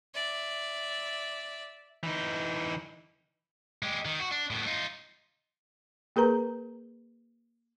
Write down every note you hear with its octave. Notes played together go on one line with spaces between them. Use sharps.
D5 E5
E3 D#4
G#3 G4
D#3
F#4
D4
A2 B3
D#4 F4
A#3 G#4 A#4 B4 A#5